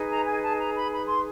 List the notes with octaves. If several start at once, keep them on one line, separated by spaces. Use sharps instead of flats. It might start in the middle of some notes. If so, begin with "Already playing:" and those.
Already playing: D#4 G#4 B4
A#5
G#5
A5
A#5
B5
B5
C6